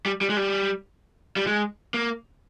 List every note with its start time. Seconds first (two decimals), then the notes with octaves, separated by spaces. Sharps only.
0.06 G3
0.21 G3
0.30 G#3
0.37 G3
1.36 G3
1.47 G#3
1.94 A#3